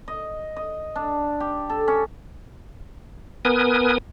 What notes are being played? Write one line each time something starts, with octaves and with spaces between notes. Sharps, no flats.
D#5
D#5
D4
G4
A4
C#4
B3 A#4 B4 G#5 D#6